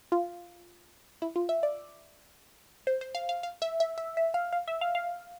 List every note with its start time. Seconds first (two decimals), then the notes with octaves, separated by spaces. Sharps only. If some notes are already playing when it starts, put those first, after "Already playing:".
0.12 F4
1.22 E4
1.36 F4
1.49 E5
1.63 D5
2.87 C5
3.01 C5
3.15 F5
3.29 F5
3.43 F5
3.62 E5
3.80 E5
3.98 E5
4.17 E5
4.34 F5
4.53 F5
4.68 E5
4.81 F5
4.95 F5